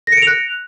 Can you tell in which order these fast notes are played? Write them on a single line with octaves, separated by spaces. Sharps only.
A#6 C#7 D7 F7 F#6